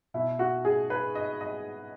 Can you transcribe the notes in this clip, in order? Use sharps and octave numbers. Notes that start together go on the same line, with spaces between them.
B2 E4
F#4
G#4
B4
D#5
D#5